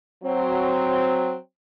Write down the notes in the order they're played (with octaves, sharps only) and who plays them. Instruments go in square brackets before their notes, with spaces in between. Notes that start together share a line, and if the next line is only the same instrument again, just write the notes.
[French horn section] F#3 C4